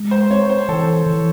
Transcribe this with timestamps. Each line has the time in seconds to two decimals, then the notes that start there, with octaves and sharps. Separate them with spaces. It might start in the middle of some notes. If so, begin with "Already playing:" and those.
Already playing: G#3
0.11 C5
0.30 C4 C#5
0.49 C5
0.68 E3 A4
1.06 E3